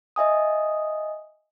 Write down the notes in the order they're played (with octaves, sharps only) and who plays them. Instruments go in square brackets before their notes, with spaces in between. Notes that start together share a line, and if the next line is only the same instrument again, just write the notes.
[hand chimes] D#5 E5 G#5 D#6